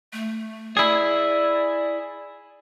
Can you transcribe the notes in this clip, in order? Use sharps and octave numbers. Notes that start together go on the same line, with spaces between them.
A3
E4 G#4 D5